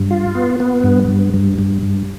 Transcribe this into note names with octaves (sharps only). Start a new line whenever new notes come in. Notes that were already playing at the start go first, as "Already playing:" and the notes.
Already playing: G2
F4
B3
B3
G2
G2
G2
G2
G2